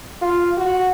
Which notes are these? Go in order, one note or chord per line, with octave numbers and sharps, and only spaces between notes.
F4
F#4